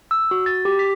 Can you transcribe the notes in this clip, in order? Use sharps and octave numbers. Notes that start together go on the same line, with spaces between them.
E6
F#4
A6
G4
B6